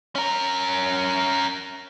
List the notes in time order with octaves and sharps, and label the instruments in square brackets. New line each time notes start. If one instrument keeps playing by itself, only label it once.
[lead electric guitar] C#4 A#4